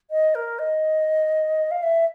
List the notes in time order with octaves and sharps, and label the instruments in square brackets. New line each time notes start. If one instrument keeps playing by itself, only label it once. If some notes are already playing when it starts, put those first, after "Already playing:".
[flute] D#5
A#4
D#5
F5
E5